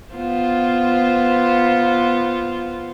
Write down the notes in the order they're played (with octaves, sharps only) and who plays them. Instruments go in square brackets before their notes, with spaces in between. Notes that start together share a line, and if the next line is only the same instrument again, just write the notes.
[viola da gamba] B3 F4 C5